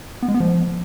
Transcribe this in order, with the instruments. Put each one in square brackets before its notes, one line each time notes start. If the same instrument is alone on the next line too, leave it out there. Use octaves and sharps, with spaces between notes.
[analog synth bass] B3
G#3
B3
F3